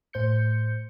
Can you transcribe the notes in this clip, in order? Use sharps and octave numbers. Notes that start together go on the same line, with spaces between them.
A2 C5 G6 C#7